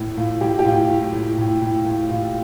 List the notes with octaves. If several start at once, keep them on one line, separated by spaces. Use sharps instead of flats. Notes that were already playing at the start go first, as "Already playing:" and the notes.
Already playing: A2
A2 F4
A2 G4
G4
A2 F4
A2
A2
A2
A2
A2
A2 F4